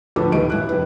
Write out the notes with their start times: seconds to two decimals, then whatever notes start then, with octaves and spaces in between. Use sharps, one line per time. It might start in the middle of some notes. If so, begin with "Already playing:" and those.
0.16 D2 A2 F3 A4 B4 D6
0.32 D#1 D#2 B4 D#5 D7
0.50 D#1 E4 F#6
0.69 F1 B4